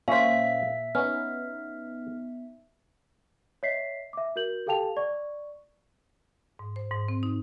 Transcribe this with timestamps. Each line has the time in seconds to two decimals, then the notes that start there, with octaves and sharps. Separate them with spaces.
0.08 A#2 C#4 C5 E5 F5 B6
0.95 B3 C#4 D#4 F6
3.63 C#5 D#5 E5 B6 C7
4.13 E5 D6
4.36 F#4 A#4 G6 F#7
4.66 G4 A4 F5 G5 A5 F7
4.97 D5 C#6
6.59 G#2
6.76 C5
6.91 G#2
7.08 C4
7.23 D#4